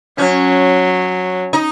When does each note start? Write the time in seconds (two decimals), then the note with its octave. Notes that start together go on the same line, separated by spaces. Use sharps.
0.18 F#3 C#4
1.53 D#4